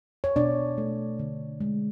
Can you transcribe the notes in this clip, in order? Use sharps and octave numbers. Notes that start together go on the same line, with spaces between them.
C#5
B2 D4 D5
A3
D3
G#3